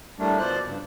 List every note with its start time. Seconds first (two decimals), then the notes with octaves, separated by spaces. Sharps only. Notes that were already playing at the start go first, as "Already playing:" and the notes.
0.19 A2 G3 A3 A#3 D4
0.39 B2 F3 C5 D5 F#6
0.66 G2 C#3